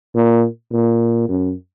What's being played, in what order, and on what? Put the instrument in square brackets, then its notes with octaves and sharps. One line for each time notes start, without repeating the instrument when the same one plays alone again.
[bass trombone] A#2
A#2
F#2